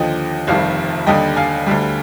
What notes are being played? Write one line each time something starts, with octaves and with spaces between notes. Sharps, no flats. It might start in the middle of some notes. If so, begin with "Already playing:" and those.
Already playing: D#2 D3 F3 D#5 G5
F1 F2 C3 D#3 G3 F5
D#2 D3 G3 D#5 G5
F5 G#5
D2 D3 G3